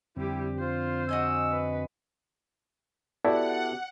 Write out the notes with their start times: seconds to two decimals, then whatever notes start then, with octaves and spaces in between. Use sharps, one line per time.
0.17 F2 D3 G3 C4 E4 G4
0.59 F4 C5
1.09 F#4 D#5 G#5 E6
1.52 B4
3.25 B3 E4 F#4 G4 A4 D5 F#5